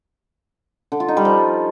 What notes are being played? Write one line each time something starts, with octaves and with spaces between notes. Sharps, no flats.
D3
F4
D#4
G3
F3